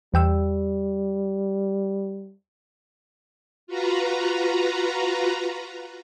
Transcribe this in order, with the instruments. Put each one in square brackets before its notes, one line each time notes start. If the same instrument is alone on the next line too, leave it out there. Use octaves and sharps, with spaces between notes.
[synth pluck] E2 G5 E6 [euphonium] G3
[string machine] F4 F#4 B4 A#5